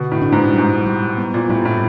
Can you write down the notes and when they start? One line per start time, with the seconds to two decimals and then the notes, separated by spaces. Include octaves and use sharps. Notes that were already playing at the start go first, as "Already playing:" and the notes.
Already playing: B2 D3
0.11 A2
0.22 D4
0.32 G#2
0.54 G#2 G3
0.86 G3
1.18 B3
1.34 A#2
1.49 A2 G3
1.65 A2